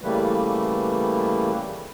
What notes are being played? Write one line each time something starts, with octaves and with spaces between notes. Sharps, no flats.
C#3 E3 G3 A3 A#3 B4